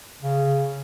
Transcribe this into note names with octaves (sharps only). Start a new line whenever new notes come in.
C#3